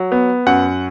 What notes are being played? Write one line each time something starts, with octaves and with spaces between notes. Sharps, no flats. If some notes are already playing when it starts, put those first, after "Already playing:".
Already playing: F#3
B3
F#2 F#5